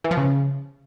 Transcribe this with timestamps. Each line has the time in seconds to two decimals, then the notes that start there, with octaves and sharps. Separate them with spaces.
0.04 E3
0.11 F3
0.17 C#3